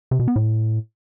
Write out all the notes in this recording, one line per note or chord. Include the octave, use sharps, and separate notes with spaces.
C3
B2
B3
A2